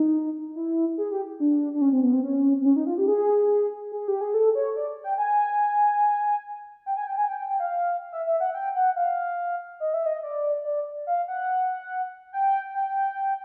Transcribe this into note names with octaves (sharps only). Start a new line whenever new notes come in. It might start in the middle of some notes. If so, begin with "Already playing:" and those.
Already playing: D#4
E4
G#4
G4
D4
D4
C#4
C4
B3
C4
C#4
C4
C#4
D#4
F4
G4
G#4
G#4
G4
G#4
A4
C#5
D5
G5
G#5
G5
G#5
G5
G#5
G5
G5
G5
F5
E5
E5
F#5
G5
F#5
F5
D#5
E5
D#5
D5
D5
F5
F#5
G5
G5